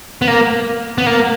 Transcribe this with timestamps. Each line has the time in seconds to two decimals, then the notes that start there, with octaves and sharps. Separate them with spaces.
0.22 B3
0.27 A#3
0.98 B3
1.06 A#3